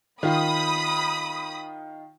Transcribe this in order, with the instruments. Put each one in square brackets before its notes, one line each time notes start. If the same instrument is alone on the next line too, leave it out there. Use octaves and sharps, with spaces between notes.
[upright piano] D#3 F4 [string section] B5 D#6